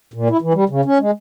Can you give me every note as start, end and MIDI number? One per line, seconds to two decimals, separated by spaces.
0.14 0.28 46
0.30 0.37 64
0.42 0.53 52
0.54 0.64 55
0.69 0.81 49
0.85 0.98 61
1.00 1.11 56